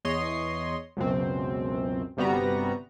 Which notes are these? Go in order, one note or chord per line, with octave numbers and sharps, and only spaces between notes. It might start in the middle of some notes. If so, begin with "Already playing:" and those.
E2 C#5 D#5 C6
C#2 F#2 B2 C4
G1 C3 G3 B3 F#4 A#5